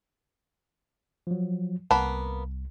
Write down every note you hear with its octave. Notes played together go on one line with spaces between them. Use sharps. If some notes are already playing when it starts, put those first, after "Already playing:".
F3 F#3
C2 A#3 B3 A5 B5